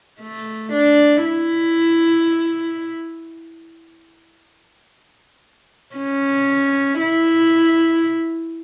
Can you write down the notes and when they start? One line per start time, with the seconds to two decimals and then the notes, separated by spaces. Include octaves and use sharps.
0.20 A3
0.72 D4
1.24 E4
5.95 C#4
7.00 E4